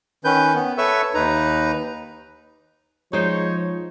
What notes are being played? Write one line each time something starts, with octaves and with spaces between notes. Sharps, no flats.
D#3 C#4 B4 G6
B3
A4 B4 C#5 E5 C#6 E6
D#2 D#4 B4 A#5
F3 G#3 D#4 C5 C#5